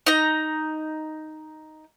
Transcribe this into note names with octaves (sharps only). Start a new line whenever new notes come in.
D#4 A#5